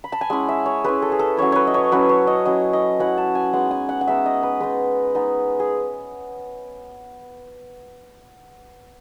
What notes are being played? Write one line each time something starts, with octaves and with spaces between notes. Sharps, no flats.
B5
A5
G#5
G#3 C#4 E4 F#5
E5
C#5
G#3 C#4 E4 B4
A4
G#4
A4
F#3 C#4 E4 C#5
B4 C#5
D#5
C#5
F#3 C#4 E4 B4
C#5
D#5
F#3 C#4 E4 D#5
D#5
F#3 C#4 E4 F#5
A5
G#5
G#3 B3 D#4 F#5
G#5
F#5
F#5
G#3 B3 D#4 E5
D#5
B4
G#3 B3 D#4 B4
G#3 B3 D#4
G#4